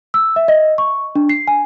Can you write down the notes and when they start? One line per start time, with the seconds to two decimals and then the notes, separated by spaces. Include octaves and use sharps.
0.14 E6
0.36 E5
0.48 D#5
0.78 C#6
1.16 D4
1.29 C7
1.48 G#5